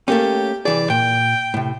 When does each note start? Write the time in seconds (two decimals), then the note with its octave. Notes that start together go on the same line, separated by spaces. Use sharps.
0.08 A3 A#3 C#4 G4
0.65 C2 E3 G#4 D5
0.90 A#2 G5
1.54 A2 C3